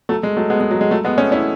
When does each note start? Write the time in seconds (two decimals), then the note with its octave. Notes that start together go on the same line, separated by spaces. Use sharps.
0.09 F#3 A3
0.23 G#3
0.37 F#3 A3
0.50 G#3 B3
0.61 G#3
0.71 F#3
0.81 G#3
0.91 F#3 A3
1.04 G#3 B3
1.18 A3 C#4
1.32 C#4 E4